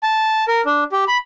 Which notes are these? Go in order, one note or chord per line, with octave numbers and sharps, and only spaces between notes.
A5
A#4
D4
G4
B5